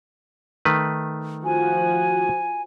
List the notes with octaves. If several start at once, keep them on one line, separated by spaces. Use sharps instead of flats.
D#3 A3 B4
F3 F#4 G#5